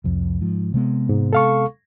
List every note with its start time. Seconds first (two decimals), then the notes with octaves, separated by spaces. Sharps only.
0.04 C2 F2
0.41 G#2 F3
0.74 C3 G#3 B3
1.09 G#2
1.33 A4 F5 C#6